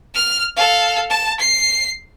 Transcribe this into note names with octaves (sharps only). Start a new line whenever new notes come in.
F6
A4 F5
A5
C7